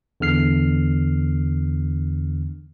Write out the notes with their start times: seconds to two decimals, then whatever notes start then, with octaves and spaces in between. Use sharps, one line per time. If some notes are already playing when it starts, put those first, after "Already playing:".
0.20 E2 D3 F6 C7